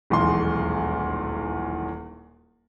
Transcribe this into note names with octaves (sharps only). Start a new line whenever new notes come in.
D#1 B1 E2 G#3 C6